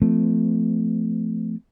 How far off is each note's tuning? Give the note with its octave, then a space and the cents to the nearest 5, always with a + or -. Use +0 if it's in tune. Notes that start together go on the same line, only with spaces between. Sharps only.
F3 -25 A3 +0 C4 -35